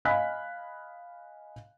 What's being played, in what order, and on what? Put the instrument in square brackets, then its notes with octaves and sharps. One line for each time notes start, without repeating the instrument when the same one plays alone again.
[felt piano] D#5 F5 G#5 B5 F#6 B6